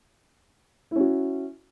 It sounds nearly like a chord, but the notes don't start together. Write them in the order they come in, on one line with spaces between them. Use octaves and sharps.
E4 C#4 F#4